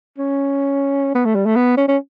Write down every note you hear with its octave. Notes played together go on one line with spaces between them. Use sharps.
C#4
B3
A3
G3
A3
B3
C#4
C#4